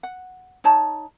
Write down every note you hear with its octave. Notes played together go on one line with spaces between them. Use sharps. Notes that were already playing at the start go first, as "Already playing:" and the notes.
F#5
D#4 C#5 A5 A#5